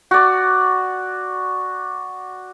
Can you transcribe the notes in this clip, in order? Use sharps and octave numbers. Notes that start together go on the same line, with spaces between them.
F#4 D5